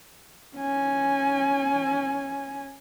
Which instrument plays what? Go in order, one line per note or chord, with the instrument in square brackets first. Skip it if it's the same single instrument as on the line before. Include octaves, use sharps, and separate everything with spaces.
[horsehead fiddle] C#4 G#5